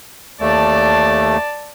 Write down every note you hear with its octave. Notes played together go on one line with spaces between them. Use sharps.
D#2 A3 D5 A5